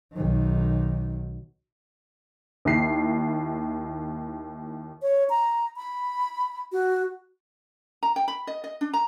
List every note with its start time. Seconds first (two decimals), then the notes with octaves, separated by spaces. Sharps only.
0.13 B1 D#3
2.65 D#2 E4 C7
5.02 C#5
5.30 A#5
5.76 B5
6.72 F#4
8.03 A#5
8.16 G5
8.28 B5
8.47 D#5
8.64 D#5
8.81 D4
8.93 A#5